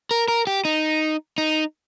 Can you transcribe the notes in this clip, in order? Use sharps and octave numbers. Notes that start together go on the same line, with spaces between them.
A#4
A#4
G4
D#4
D#4